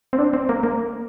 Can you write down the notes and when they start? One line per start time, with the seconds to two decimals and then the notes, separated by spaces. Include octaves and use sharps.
0.13 C4
0.18 D4
0.33 C4
0.49 A#3
0.63 A#3